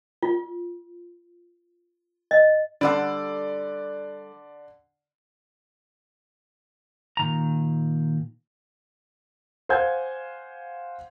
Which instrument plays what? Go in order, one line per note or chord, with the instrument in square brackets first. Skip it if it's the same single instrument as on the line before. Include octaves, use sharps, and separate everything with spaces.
[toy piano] F4
D#5
[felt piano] D3 C6 [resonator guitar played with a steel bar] G3 A4 F#5 [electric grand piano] D5
[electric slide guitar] A#2 D#3 A#5
[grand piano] C5 F5 F#5 G#5 G6 G#6